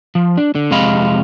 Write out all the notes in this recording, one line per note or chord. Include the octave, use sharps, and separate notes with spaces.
F3
D4
D3
F2 C3 G#3 D#5 F5 B5